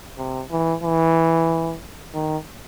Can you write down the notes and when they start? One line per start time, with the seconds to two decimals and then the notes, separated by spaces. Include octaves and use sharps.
0.18 C3
0.51 E3
0.83 E3
2.14 D#3